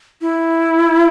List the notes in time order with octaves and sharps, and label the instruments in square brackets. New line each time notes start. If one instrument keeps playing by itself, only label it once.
[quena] E4